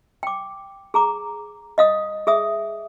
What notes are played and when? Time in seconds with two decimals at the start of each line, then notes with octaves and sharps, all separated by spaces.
0.23 G5 D6
0.94 G#4 A#5 D6
1.78 D#5 F5 D#6
2.27 G#4 E5 D#6